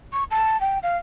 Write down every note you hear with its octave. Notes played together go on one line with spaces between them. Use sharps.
C#6
A5
G5
F5